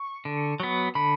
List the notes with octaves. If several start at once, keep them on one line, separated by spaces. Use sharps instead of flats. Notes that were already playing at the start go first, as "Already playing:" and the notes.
Already playing: C#6
D3
F#3 B3
D3 B5